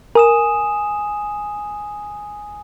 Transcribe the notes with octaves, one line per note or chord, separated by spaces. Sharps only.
A#4 G#5 D#6 E7